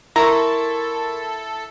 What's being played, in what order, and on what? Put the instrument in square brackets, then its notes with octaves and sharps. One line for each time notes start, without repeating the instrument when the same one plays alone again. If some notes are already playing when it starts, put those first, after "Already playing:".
[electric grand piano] E4 [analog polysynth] A4 [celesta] A#4 C6 C#6 [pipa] A#5